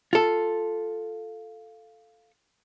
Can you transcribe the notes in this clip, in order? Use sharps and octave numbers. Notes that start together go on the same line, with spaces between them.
F4 A4